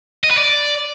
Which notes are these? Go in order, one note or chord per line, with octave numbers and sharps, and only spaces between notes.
D#5
B4
D5